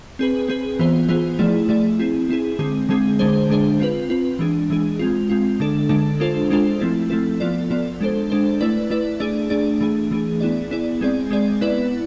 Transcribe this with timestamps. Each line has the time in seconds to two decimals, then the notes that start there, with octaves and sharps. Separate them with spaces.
0.19 C4 G#4 B4
0.48 C4 G#4 B4
0.79 E3 B3 F4 G#4 C5
1.09 E3 B3 F4 G#4 C5
1.39 F3 A3 E4 G#4 D5
1.69 F3 A3 E4 G#4 D5
1.99 C4 E4 G#4
2.29 C4 E4 G#4
2.59 D3 G#3 C4 G#4
2.89 D3 G#3 C4 G#4
3.19 D3 G#3 D4 G#4 C5
3.49 D3 G#3 D4 G#4 C5
3.80 C4 F4 B4
4.10 C4 F4 B4
4.39 E3 G#3 D4 G#4
4.70 E3 G#3 D4 G#4
4.99 G#3 C4 F4
5.29 G#3 C4 F4
5.60 D3 G#3 D4 A4
5.89 D3 G#3 D4 A4
6.20 G#3 D4 F4 A4 C5
6.50 G#3 D4 F4 A4 C5
6.80 F3 A3 C4 E4 A4
7.10 F3 A3 C4 E4 A4
7.40 F3 B3 F4 A4 D5
7.70 F3 B3 F4 A4 D5
8.01 G#3 D4 A4 C5
8.30 G#3 D4 A4 C5
8.60 A3 E4 B4 D5
8.90 A3 E4 B4 D5
9.20 A3 D4 G#4 D5
9.50 A3 D4 G#4 D5
9.81 E3 A3 D4 G#4
10.11 E3 A3 D4 G#4
10.40 B3 E4 G#4 D5
10.71 B3 E4 G#4 D5
11.01 G#3 C4 G#4 D5
11.31 G#3 C4 G#4 D5
11.61 B3 E4 B4 D5